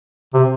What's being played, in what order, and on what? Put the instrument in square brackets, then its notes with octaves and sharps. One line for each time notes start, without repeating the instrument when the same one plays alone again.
[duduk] C3